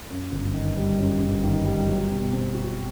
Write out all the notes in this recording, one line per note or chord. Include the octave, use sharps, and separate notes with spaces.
F#2
G1
D#3
G3
F#2
G1
D#3
G3
F#3
B2
C4
F#4